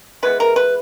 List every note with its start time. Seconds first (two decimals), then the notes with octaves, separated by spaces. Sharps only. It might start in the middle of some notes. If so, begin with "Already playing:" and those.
0.23 E3 G#3 B3 B4
0.40 A#4
0.56 B4